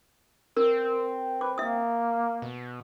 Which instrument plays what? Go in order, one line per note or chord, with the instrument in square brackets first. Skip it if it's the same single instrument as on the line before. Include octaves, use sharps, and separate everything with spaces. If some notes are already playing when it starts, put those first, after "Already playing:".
[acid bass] C4 [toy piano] A#4
[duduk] B4 [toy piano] D6
[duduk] A#3 [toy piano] E5 D#6
[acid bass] B2